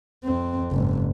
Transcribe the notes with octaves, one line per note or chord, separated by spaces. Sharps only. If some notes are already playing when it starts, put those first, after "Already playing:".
F2 C4
F#1 G#2